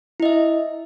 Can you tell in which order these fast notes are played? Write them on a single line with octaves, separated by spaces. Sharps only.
E4 D#5 E5